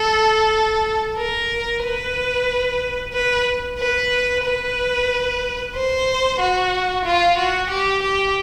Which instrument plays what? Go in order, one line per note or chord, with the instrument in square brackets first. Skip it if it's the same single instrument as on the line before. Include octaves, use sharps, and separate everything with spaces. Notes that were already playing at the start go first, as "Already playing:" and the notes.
Already playing: [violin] A4
A#4
B4
B4
B4
B4
C5
F#4
F4
F#4
G4
G4